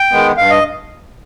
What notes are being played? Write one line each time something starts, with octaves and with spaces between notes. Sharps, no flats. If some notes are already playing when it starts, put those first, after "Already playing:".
Already playing: G5
D#3 G#3 B3
G2 F5
D#5